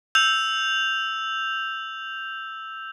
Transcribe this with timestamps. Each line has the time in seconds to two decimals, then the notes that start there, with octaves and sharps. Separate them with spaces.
0.15 E6 G6 F7